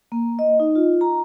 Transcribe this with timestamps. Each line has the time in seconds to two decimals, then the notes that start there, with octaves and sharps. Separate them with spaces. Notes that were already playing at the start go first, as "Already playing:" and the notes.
0.12 A#3
0.39 D#5
0.60 D#4
0.75 F4
1.01 A#5